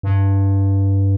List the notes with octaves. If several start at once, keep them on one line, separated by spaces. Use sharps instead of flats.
G2